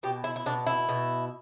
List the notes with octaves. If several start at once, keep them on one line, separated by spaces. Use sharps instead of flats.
B2 G4
E4
E4
B2 D4
E4
B2